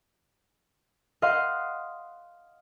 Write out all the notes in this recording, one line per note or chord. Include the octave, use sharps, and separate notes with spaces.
D#5 F5 F#5 C6